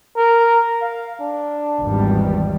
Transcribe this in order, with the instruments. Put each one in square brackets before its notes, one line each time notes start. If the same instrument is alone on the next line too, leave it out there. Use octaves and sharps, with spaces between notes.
[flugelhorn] A#4
F5
D4
[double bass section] G#1 E2 G3